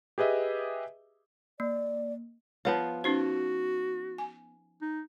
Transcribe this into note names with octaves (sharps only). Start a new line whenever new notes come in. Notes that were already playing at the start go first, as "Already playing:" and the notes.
G4 G#4 B4 D#5 E5
A#3 D5
F3 B3 F4 C#5
C#4 D#4 F#4 C5
G#5
D#4